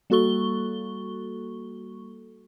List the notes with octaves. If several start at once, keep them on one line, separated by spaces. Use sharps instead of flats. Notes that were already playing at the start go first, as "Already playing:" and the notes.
G3 A#3 F#4 A4 C#6 G7